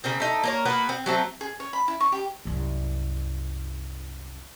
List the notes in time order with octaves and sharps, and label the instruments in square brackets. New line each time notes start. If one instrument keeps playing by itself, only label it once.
[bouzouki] C#3 A#3 C4
A3 D#4
A#3 A#4 C#5
A#3 B3 F#4 B4
C4
F#3 A3 C4
[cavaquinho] G#4
C#5
B5
E4
C#6
G4
[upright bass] C2 F#2